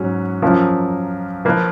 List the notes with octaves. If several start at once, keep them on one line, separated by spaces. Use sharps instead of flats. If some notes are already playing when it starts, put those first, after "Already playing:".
Already playing: G#2 F#3 C#4
F#2 F3 A#3
F3 A#3 F4 B4